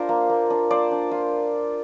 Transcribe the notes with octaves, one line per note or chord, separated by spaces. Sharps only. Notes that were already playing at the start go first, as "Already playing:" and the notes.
Already playing: D4 F4 A#4 C5
A#3
A#3
D4
A#3 C5 D5
D4
F4